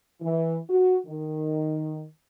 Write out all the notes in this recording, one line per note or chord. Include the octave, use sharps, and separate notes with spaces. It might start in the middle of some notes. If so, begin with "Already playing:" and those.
E3
F#4
D#3